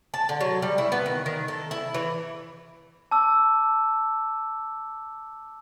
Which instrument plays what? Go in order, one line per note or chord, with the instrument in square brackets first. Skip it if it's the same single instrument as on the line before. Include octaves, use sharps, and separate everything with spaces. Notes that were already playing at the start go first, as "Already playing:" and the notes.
[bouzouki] A5
D3
F#3
G3
E4
B3
D#3
D#3
A4
E4
E3
[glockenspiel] A5 D6 E6